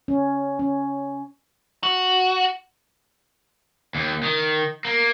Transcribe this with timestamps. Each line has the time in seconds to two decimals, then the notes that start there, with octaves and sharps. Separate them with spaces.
0.08 C#4
0.59 C#4
1.83 F#4
3.95 D#2
4.23 D#3
4.85 A#3